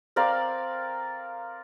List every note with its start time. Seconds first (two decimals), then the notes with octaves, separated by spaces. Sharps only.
0.16 C4 A#4 D5 F5